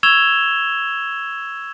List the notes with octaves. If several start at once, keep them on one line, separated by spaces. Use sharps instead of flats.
C#6 E6 G#6 E7 F7 G7